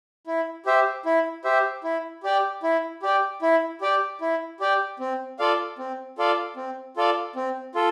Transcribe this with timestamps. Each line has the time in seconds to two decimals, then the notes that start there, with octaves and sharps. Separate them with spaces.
0.27 E4
0.66 G4 C5 E5
1.05 E4
1.44 G4 C5 E5
1.84 E4
2.23 G4 D5 G5
2.63 E4
3.03 G4 D5 G5
3.42 E4
3.81 G4 D5 G5
4.21 E4
4.60 G4 D5 G5
5.00 C4
5.39 F4 A4 D5 F5
5.79 C4
6.18 F4 A4 D5 F5
6.56 C4
6.97 F4 A4 D5 F5
7.36 C4
7.75 F4 A4